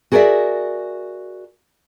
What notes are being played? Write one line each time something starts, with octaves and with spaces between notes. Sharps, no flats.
F#4 G#4 A#4 B4 D5 E5